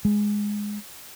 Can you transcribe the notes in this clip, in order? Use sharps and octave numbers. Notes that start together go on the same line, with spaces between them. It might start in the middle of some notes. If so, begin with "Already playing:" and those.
G#3